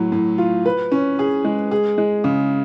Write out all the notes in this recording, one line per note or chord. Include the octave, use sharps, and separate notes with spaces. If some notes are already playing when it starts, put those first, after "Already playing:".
Already playing: A2 F#3
A2
F4
B4
C#4
G#4
G#3
G#4
G#3
C#3